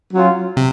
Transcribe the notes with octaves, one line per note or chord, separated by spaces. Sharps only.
F#3 C#4 F4
C3